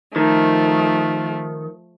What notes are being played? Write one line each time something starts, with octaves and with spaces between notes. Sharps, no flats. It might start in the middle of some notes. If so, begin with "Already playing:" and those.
D#3 F3 A3